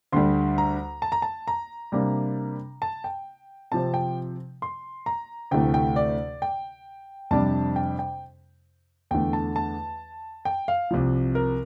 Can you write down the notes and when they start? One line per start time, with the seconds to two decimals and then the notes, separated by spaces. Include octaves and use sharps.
0.12 D2 D3 G3 C6
0.58 A#5
1.02 A5
1.12 A#5
1.22 A5
1.48 A#5
1.92 C3 G3 A#3 D4
2.82 A5
3.04 G5
3.72 C3 F3 C4 A5
3.94 G5
4.62 C6
5.06 A#5
5.51 D2 C3 E3 A3 G5
5.74 G5
5.96 D5
6.42 G5
7.31 F2 C3 G3 D4 A5
7.76 G5
7.99 G5
9.11 E2 D3 A3 G5
9.33 A5
9.56 A5
10.45 G5
10.68 F5
10.91 C2 C3 F3
11.35 A#4